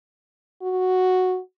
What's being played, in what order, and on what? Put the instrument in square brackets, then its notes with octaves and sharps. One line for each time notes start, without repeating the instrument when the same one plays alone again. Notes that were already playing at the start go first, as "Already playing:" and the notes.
[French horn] F#4